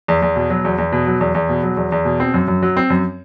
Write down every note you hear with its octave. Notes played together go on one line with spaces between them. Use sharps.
E2
E2
B2
F#3
E2
E2
B2
F#3
E2
E2
B2
F#3
E2
E2
B2
C4
F#2
F#2
F#3
C4
F#2